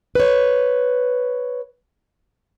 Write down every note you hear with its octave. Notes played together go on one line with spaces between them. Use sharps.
B4 C#5